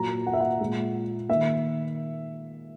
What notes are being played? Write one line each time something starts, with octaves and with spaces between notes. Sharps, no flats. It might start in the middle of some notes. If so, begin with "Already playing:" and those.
Already playing: A#2 F#3 A#3 A#5
F#5
E5
F#5
A#2 G#3
D#3 A#3 E5